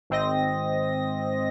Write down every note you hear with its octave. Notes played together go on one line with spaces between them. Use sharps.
G#1 C4 D#5 A#6